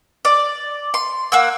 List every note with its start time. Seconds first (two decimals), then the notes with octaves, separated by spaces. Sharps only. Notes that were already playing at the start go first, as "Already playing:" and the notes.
0.25 D5
0.94 C6
1.32 A#3 F#5 E6